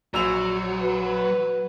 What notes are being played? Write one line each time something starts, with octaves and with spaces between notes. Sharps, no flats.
A#1 F#3 E6 F7
B4